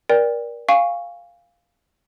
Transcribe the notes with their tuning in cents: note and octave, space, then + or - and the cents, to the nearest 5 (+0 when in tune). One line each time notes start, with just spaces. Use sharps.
A#4 +30 D5 +0 G5 +30
F5 +0 G#5 -25 C#6 +0